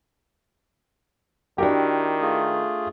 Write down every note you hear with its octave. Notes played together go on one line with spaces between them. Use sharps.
D#3 D4 E4 F#4 G4 A#4
A3 F4 G#4